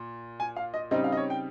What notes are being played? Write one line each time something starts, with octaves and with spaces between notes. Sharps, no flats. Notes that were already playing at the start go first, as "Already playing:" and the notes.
Already playing: A#2
G#5
F5
D#5
C#3 G3 C4 D#4 D#5
F5
D#5
C#5
G5